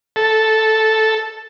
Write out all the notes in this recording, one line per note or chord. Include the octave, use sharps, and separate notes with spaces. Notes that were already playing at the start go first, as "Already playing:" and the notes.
A4